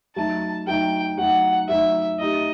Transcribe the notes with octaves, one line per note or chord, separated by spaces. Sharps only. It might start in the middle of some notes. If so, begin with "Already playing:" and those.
F#3 A3 D#4 A5
F#3 A3 D#4 G5
F#3 A3 D#4 F#5
F#3 A3 D#4 E5
A3 D#4 G4 D#5